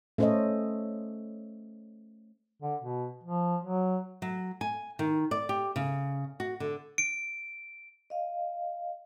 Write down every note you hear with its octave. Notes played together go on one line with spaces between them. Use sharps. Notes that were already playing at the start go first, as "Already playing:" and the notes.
A3 C#4 A4 C5 C#5 D#5
D3
B2
F3
F#3
F#3
G#5
D#3
D5
G4
C#3
F#4
D3
D7
D#5 F5